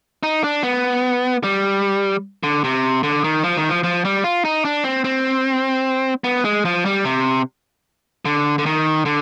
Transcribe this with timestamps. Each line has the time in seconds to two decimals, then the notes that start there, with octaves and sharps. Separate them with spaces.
0.23 D#4
0.44 D4
0.63 B3
1.43 G3
2.43 D3
2.64 C3
3.03 D3
3.24 D#3
3.44 F3
3.57 D#3
3.69 F3
3.83 F3
4.05 G3
4.24 F4
4.45 D#4
4.65 D4
4.84 C4
5.04 C4
6.24 B3
6.45 G#3
6.65 F3
6.85 G3
7.05 C3
8.25 D3
8.58 D3
8.66 D#3
9.05 D3